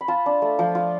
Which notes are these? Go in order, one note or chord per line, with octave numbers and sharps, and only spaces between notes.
B5
F4 A5
D4
A3
F3
F4